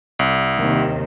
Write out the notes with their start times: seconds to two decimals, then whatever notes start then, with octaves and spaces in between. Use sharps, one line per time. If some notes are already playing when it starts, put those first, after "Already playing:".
0.19 C2
0.58 D#2 C3 D#3